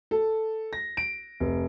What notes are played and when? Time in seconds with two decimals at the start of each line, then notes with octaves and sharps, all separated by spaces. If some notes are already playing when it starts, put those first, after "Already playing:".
0.11 A4
0.73 A#6
0.97 D7
1.40 F1